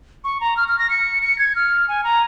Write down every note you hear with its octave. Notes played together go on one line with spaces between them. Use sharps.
C#6
A#5
F6
F6
A#6
C#7
C#7
G#6
F6
G#5
A#5